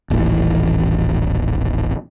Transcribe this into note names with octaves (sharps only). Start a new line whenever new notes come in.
D#1 A1 E3